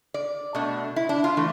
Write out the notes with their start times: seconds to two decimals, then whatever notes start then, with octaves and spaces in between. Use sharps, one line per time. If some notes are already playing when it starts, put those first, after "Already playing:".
0.14 D5
0.55 B2 A3 D4
0.96 E4
1.09 D4
1.24 F4
1.37 E3 A3